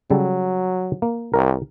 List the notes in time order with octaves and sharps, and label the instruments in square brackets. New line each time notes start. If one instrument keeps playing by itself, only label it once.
[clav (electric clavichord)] C#3 G3 A4 [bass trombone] F#3
[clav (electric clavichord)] A#3
[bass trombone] C2 [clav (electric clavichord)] A#4